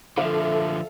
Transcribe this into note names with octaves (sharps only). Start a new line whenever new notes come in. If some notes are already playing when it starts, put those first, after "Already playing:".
D3 F3 A4 E5 F5